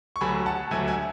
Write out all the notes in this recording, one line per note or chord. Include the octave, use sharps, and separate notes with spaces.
C#6
D2 D3 F#3 G#5 B5
F#5 A5
D2 D3 F#3 E5 G#5
E5 G#5